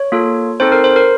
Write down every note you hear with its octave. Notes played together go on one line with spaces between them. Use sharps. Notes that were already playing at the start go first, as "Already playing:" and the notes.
Already playing: C#5
A#3 F4 A4
C4 D#4 A4 C5
A#4
C5
A#4